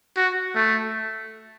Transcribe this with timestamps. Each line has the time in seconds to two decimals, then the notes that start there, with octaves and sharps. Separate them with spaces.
0.17 F#4
0.55 A3